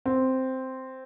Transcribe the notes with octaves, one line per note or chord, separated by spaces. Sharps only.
C4